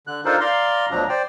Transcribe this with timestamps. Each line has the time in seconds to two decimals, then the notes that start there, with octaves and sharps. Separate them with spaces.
0.07 D3 F#6
0.25 D4 D#4 F4 A4 A#4 C5
0.41 D5 F5 A#5 C6
0.91 D2 B2 F3 F#3 D4 A#5
1.09 C5 D5 G5